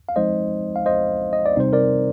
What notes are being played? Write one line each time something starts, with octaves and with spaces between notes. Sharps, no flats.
F5
F3 G#3 C4 D#4 C5 D#5
F5
C5 D#5
D#5
D5
C3 G3 C4 D#4 C5
A#4 D5